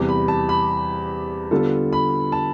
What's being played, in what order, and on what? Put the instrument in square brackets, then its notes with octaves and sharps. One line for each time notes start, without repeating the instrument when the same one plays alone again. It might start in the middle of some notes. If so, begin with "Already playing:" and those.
Already playing: [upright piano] E2 C3 G3
[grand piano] B5
A5
B5
[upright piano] D3 G3 B3 F4 A4
[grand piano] B5
A5